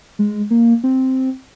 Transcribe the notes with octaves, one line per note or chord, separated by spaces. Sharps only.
G#3
A#3
C4